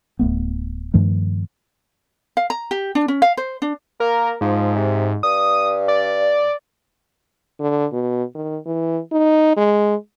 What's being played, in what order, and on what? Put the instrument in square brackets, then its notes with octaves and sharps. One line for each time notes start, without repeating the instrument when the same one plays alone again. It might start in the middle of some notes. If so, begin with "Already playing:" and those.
[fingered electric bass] D1 G#1 A3 B3
G2 D#3 F3 A3
[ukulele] F5
A#5
G4
D4
C#4
F5
C5
D4
[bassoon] A#3 [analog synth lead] A#4
[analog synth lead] G#2 [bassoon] F3
[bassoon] C3
[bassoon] G2 [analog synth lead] D#6
[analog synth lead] D5
[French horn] D3
B2
D#3
E3
D#4
G#3